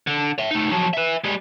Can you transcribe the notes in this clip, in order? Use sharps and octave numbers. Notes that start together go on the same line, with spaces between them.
D3
C#5 E5
A3 D#4
F3 F#3
B4 E5
G3 G#3